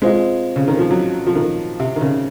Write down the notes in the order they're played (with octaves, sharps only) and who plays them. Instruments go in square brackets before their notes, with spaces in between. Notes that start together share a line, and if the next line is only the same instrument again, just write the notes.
[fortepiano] G#3 [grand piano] C4 F4 C5 D#5
[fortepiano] C#3
D#3
F3
F#3
F3
D#3
C3
D#3
C#3